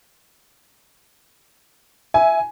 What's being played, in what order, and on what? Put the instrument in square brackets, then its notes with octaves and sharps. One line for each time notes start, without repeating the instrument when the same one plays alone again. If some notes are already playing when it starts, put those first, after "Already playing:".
[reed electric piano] E5 [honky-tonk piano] G#5